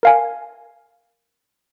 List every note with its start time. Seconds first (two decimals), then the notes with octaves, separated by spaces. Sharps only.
0.03 A#4 F5 G#5